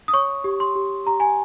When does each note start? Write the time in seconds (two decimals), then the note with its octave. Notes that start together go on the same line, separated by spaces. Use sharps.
0.08 D#6
0.13 C#5 C#6
0.44 G4
0.60 C6
0.76 G4
1.06 G4 A#5
1.20 G#5